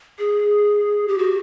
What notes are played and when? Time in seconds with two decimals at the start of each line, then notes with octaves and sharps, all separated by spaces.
0.19 G#4
1.08 G4
1.18 F#4